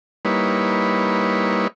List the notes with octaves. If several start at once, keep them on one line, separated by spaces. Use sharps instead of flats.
G3 A#3 D#4 E4 B4 C#5